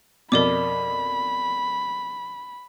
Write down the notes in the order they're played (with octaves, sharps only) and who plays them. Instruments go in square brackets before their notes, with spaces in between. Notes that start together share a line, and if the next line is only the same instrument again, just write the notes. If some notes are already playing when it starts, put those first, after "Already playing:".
[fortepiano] F2 B2 [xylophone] A#4 D5 D6 [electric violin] B5